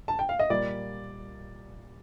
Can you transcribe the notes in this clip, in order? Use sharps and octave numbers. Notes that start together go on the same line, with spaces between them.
A5
G5
F5
D#5
A#2 G3 A#3 D5